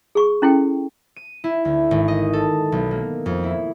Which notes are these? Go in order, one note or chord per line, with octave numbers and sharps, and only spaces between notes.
G#4 C#6
C#4 E4 A4 G5
D#7
E4
D2
G#1
D#5
A4
B1
A#3
F2
E4